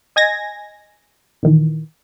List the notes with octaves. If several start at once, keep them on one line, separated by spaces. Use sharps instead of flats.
D#5 G#5 G#6 A#6
A#2 D#3 E3